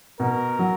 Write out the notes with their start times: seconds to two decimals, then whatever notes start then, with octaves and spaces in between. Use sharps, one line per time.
0.20 B2 A#4
0.59 F#3